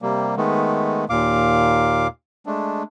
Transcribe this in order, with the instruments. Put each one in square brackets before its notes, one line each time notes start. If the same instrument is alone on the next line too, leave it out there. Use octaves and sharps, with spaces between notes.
[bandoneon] C3 G3 A#3
D#3 G#3 A3 B3
D#2 A#2 F5 D6
G#3 A3 D4